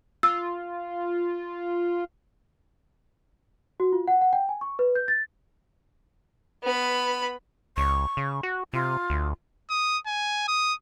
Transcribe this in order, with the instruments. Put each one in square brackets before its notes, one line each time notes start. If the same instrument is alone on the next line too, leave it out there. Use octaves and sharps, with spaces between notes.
[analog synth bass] F4 [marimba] E6
[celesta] F#4
F4
F#5
F#5
G5
G#5
C#6
B4
G6
A6
[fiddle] B3 B5
[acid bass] C#2 [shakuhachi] C#6
[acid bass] C#3
F#4
[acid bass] C3 [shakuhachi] F4
[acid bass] D2
[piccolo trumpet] D#6
G#5
D#6